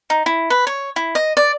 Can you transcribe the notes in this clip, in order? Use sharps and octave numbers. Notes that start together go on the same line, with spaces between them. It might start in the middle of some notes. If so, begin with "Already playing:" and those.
D#4
E4
B4
C#5
E4
D#5
D5